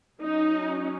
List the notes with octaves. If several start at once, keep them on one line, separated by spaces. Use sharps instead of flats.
F#3 C#4 D#4